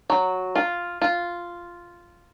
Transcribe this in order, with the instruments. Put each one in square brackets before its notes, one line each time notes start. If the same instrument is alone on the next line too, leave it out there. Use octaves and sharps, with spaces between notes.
[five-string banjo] F#3
F4
F4